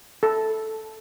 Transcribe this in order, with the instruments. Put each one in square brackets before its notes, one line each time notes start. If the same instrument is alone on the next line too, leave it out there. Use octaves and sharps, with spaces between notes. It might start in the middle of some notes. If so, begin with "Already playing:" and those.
[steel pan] A4